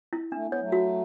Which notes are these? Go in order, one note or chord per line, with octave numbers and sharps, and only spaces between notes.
E4
A3 D4
B3
C#5
F#3 A3
F#4